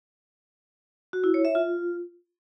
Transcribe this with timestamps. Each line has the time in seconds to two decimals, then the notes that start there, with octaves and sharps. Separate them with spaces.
1.13 F#4
1.24 E4
1.34 C#5
1.45 E5
1.55 F4